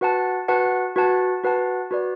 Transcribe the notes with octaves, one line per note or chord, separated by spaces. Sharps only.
F#4 B4 F#5 A5
F#4 B4 F#5 A5
F#4 B4 F#5 A5
F#4 B4 F#5 A5
F#4 B4 D5